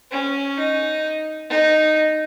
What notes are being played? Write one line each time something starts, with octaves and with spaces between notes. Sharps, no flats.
C#4
D#4
D#4